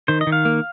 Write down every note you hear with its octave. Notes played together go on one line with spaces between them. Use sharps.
D#3 C5
D#5
D#3
F5
A#3